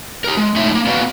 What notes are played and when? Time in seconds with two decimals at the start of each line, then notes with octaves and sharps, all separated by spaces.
0.24 G4 A#4
0.37 G#3
0.56 A3 D#4 E4 C#5 E5
0.72 G#3 A#3
0.87 B3 F#4 B4 D5 F5